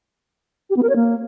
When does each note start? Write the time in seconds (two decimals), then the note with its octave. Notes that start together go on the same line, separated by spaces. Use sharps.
0.70 G4
0.76 B3
0.83 A#4
0.89 C#5
0.96 A#3